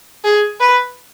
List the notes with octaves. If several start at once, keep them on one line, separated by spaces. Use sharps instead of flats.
G#4
B4